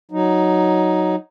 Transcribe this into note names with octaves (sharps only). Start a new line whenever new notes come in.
F#3 D#4